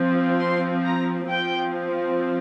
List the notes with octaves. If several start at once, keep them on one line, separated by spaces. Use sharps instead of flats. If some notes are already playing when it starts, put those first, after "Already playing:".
Already playing: F3 C4
C6
A#5
F3 C4 G5